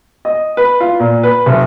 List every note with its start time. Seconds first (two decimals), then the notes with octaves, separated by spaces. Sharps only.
0.25 D#5
0.57 B4
0.80 F4
1.00 A#2
1.23 B4
1.46 F#1